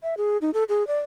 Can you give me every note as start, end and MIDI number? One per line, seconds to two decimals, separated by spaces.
0.03 0.14 76
0.17 0.38 68
0.41 0.51 63
0.54 0.64 69
0.69 0.86 68
0.87 0.99 74